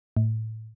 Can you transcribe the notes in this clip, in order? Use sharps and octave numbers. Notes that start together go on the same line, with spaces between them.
A2